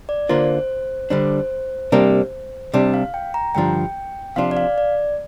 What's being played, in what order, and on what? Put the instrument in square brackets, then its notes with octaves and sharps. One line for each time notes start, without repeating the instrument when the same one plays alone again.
[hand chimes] D5
[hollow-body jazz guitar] D3 A#3 D4 F4 A#4 [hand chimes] C5
[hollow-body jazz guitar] D3 G3 D4 [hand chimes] C5
[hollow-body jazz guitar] C3 G3 A#3 D4 A#4
C3 G3 D4
[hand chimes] F5
G5
A#5
[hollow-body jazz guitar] G2 D3 F3 D4 [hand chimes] G5
[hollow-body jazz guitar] C3 F3 D4 F4 [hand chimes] F5
[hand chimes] D5
F5
D5